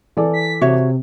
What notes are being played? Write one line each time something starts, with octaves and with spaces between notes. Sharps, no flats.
E3 A4 D5
B6
C3 F#4 C#5 E5